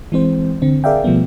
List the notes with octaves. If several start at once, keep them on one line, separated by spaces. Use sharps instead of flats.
E3 G#3 C4 C5
D3 C4
G#4 A#4 D5 E5 F5 G5
B2 F3 G3 A3 B3